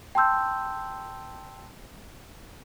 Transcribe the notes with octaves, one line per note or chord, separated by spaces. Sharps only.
G5 A5 C6 E6 G6